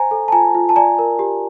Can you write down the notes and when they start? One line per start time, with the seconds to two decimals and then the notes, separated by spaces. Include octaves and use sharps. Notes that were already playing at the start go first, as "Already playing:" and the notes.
Already playing: C5 G#5 A#5
0.11 A4
0.28 A5
0.32 F4 G#5 A#5
0.55 F4
0.69 A5
0.76 D5 G#5 A#5
0.99 A#4
1.19 G4